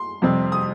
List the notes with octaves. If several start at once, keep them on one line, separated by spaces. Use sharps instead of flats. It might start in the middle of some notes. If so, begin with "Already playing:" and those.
Already playing: C6
F2 C3 G3 C4
D#6